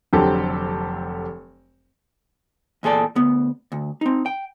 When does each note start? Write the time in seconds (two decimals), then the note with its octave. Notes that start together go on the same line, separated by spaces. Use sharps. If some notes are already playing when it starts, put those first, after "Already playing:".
0.13 F1 D3 F#3 C4 G4 A4
2.83 E2 A#2 G#4 A4 D5
3.15 D2 B3
3.72 D2
4.01 C4 D#4
4.26 G5